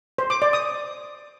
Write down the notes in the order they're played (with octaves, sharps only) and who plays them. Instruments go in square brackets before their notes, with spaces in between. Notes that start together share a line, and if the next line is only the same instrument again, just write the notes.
[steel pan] C5
D6
D5
D#6